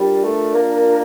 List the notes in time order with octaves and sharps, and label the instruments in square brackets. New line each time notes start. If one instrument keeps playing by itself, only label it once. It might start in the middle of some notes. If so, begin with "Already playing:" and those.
Already playing: [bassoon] G3 [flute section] D4 F4 A#4 D5
[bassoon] A3
A#3